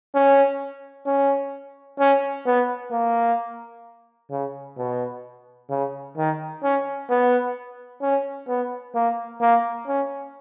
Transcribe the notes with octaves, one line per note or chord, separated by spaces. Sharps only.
C#4
C#4
C#4
B3
A#3
C#3
B2
C#3
D#3
C#4
B3
C#4
B3
A#3
A#3
C#4